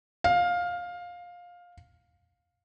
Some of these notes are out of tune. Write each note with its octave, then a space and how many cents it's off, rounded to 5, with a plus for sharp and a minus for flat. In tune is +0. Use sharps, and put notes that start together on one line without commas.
F5 +15